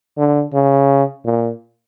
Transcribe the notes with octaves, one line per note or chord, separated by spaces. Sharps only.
D3
C#3
A#2